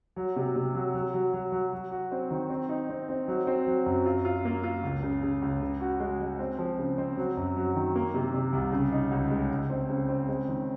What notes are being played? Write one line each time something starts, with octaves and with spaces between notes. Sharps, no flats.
F#3
C3
C3
F#3
F#3
F#3
F#3
F#3
F#3
F#4
C4
D#3
C4
D#4
C4
C4
F#3
C4
F#3
F#2
F4
F4
A#3
F4
C#2
C#3
C#3
C#2
C#3
F#4
G#3
G#3
C4
F3
C#3
C4
F#3
F#2
F#3
D#3
A#3
C3
C3
C2
C#3
D#4
C#2
G#3
C#2
C4
C#3
C4
G#3
D#3